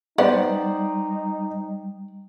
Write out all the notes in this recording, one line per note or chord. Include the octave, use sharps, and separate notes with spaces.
G3 B3 D#4 C5 D5